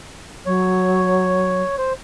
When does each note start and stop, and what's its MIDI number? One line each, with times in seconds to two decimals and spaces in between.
0.46 1.62 54
0.46 1.76 73
1.78 1.93 72